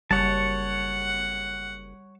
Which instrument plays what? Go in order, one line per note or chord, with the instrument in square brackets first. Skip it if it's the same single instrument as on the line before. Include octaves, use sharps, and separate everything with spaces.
[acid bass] F#1 [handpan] G3 [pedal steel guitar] C#5 A5 [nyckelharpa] F#5